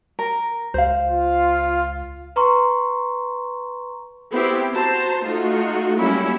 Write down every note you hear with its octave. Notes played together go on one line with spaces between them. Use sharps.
A#4
C#2 C5 F5
F4
B4 A#5 C6 C#6
B3 C4 E4 G4
F#4 C5 A5 A#5
A3 D#4 F4 F#4
F#3 G3 A#3 C#4 E4